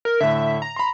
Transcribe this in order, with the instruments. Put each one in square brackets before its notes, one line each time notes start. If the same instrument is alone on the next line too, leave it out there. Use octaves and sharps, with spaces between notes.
[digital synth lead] A#4
[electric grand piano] A2 D3 [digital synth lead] E5
[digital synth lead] A#5
[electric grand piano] B5 C6